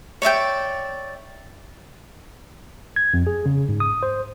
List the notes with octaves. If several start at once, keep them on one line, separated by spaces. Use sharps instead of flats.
C#5 D5 E5 G5
G#6
F2
G#4
C#3
G#2
D#6
C5